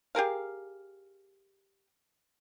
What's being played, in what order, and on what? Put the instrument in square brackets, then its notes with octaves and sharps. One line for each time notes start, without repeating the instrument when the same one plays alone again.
[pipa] G4 G#4 A#4 F5